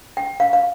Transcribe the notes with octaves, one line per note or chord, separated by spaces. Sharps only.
G5
F5
F5